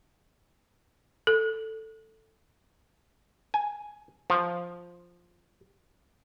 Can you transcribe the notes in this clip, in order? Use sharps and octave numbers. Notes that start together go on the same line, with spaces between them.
A4
G#5
F3